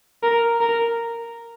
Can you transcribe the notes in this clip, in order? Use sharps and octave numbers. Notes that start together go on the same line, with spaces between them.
A#4
A#4